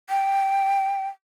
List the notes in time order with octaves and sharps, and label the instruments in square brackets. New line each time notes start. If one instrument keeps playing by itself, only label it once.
[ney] G5